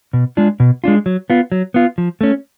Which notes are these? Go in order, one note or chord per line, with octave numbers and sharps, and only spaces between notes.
B2
G#3 D4 F4
B2
G#3 D4 F4
F#3
B3 F4
F#3
B3 F4
F3
A3 C#4